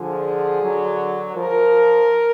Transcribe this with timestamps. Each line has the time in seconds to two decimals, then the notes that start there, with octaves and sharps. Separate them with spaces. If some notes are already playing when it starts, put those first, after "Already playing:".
Already playing: D3 F3 G#4
0.62 D3 F#3
1.36 F3 A#4